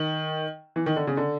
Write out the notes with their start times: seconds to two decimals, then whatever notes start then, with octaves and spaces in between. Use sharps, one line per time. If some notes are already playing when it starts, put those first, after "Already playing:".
Already playing: D#3
0.76 E3
0.86 D#3
0.96 D3
1.07 C#3
1.17 D3